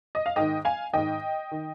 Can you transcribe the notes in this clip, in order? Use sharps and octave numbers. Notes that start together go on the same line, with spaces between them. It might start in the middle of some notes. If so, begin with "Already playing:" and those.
D#5
F5
G#2 D#3 D#5 G5
F5 G#5
G#2 D#3 D#5 G5
D#3